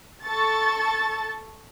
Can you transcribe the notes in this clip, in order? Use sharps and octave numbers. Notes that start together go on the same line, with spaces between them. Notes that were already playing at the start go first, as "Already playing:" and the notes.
A4 C#6 A6